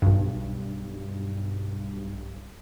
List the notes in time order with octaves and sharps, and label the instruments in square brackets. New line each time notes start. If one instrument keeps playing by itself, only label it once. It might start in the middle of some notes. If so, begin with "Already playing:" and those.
[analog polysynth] B1 G2